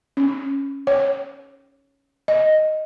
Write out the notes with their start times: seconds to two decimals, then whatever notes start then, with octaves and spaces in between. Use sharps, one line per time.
0.17 C#4
0.87 C#5
2.28 D#5